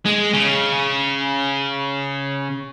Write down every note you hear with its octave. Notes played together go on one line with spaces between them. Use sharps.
G#3
C#3